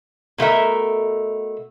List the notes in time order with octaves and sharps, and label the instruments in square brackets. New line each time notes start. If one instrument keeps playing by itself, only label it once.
[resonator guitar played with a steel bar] B2 A3 A#4 E5